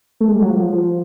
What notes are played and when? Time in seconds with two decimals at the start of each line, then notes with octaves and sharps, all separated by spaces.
0.20 A3
0.28 G#3
0.35 G3
0.42 F#3
0.50 F3
0.72 F3